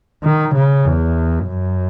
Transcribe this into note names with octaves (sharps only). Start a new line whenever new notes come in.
D#3
C#3
E2
F#2